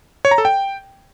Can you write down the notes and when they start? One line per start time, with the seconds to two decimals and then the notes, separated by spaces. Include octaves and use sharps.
0.25 C#5
0.31 A#5
0.38 A4
0.45 G5